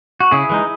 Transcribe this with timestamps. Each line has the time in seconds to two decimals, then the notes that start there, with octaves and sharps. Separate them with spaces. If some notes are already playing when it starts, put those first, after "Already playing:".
0.20 F#4
0.31 C#3 E4 G#4
0.50 E3 G#3 D#4